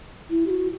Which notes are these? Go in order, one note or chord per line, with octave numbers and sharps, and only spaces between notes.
E4
G4
F#4